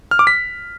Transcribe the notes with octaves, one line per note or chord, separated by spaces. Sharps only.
F6
D6
B6